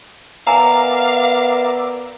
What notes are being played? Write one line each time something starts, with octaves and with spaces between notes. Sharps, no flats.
B3 A#4 D5 E5 F5 G#5 A#5